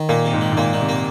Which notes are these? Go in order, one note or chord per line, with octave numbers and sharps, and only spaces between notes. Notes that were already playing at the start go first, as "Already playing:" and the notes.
Already playing: D#3
A#2 A#3
C3
G#2
D#3
G#2
A#2 A#3
A#2 D#3
C3
A#3